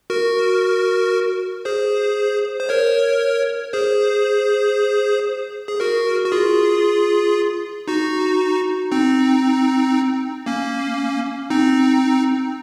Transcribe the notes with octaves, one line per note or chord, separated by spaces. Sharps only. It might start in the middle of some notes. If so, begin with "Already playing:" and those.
F#4 A#4
G#4 C5
C5
A#4 C#5
G#4 C5
G#4
F#4 A#4
F#4
F4 G#4
D#4 F#4
C4 D#4
A#3 C#4
C4 D#4